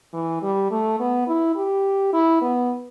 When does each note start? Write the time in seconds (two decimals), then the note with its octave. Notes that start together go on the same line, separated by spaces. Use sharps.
0.13 E3
0.42 G3
0.71 A3
1.00 B3
1.28 E4
1.56 G4
2.13 E4
2.42 B3